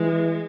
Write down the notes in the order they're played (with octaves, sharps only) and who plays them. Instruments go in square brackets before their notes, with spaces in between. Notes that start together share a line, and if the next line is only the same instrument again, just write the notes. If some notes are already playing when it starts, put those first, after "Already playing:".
Already playing: [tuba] E3 [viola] G#3